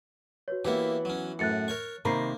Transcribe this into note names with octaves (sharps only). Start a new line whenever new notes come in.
F#4 B4 C#5
E3 A#3 B3 E4 G4
F#3 C#4
F#2 A2 F#6 A6 C#7
A#4 C#5 C#6
C3 D#3 A#3 A#4 B5 A#6 C7